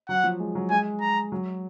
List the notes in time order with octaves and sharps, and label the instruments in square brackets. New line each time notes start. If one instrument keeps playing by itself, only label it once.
[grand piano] F#3 [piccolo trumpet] F#5
[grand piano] F3
G#3
F#3
[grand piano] G#3 [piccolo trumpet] G#5
[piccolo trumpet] A#5
[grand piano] F#3